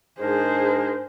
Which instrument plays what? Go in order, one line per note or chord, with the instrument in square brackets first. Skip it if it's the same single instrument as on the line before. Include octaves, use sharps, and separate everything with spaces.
[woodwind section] G#2 D4 A#4 [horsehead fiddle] G#4 C5